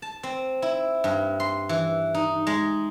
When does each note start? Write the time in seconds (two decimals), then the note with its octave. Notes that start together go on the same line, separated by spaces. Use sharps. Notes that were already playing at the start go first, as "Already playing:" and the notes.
0.02 A5
0.23 C4
0.62 E4
1.04 G2
1.40 C6
1.69 E3
2.15 D#4
2.47 G#3